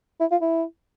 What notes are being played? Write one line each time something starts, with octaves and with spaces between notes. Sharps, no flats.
E4
F4
E4